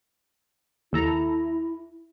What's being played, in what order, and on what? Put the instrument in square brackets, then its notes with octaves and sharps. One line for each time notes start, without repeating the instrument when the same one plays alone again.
[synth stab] D#2 A4 A#5 [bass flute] E4